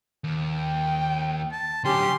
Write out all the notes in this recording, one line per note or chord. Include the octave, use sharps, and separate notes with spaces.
D#2
G5
A5
D3 F#3 C#4 G4 C6